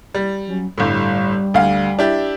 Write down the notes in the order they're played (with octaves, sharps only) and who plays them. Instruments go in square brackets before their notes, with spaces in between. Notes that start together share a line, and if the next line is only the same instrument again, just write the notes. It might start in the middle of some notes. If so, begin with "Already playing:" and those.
[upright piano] G3
[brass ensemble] F#3 C#4
[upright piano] G1 A2 [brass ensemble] G3
[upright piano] D2 F5
D4 E4 G4